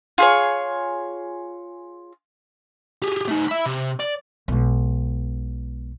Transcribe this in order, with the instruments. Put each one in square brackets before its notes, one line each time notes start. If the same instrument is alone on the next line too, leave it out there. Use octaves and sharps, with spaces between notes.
[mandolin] F4 G#4 C#5
[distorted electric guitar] G4 G#4
A3 D#4
E5 B5
C3
D5
[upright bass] B1 G#3